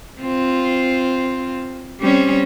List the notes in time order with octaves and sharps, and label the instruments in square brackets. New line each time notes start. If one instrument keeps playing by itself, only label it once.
[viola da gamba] C4 F4
G3 C4 C#4